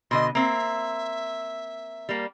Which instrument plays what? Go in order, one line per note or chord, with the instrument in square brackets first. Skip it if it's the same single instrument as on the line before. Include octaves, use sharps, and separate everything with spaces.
[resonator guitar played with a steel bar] B2 D3 D#5 [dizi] C6
[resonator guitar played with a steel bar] A#3 C4 [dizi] E5
[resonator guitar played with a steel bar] G3 A#3